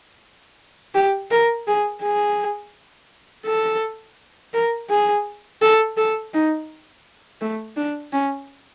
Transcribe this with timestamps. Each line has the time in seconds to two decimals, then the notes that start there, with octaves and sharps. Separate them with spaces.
0.95 G4
1.31 A#4
1.67 G#4
2.03 G#4
3.46 A4
4.54 A#4
4.90 G#4
5.62 A4
5.97 A4
6.34 D#4
7.41 A3
7.77 D4
8.12 C#4